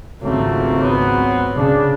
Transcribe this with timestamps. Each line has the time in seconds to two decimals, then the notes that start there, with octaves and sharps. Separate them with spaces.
0.22 G#1 C#2 F#3 A3 A#3 C4
0.83 F#3 B3
1.56 C#3 D4